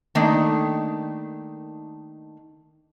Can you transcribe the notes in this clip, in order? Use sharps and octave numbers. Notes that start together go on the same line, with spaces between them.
D#3 A3 A#3 D4 D#4